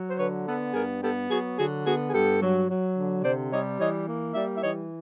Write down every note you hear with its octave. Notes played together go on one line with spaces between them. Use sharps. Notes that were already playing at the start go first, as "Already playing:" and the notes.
Already playing: F#3
C5
D3 B4 C#5
B3 A4 B4
G2 G#4 A#4
B3 G4 A4
F#3 F#4 G#4
D3 F#4 G#4
B3 F#4 G#4
G#4
G2 G4 A4
F#3
F#3
D3
C3 C5 D5
G3 C#5 D#5
E3 C#5 D#5
A#3
G3 D5 E5
E5
E3 C#5 D#5